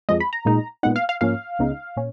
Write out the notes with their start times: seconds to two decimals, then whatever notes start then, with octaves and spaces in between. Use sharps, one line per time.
0.09 F2 F3 G#3 D#5
0.20 B5
0.33 A#5
0.45 A#1 A#2 G#3 D#4
0.83 A#2 G#3 B3 D#4 F#5
0.96 F5
1.09 F5
1.21 G#2 F3 A#3 C#4 F5
1.59 C#2 C#3 G#3 B3 D#4
1.96 A#2 C#4